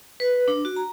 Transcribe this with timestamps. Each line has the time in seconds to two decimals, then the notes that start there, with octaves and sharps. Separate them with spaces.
0.20 B4
0.48 D4
0.65 F#4
0.76 A#5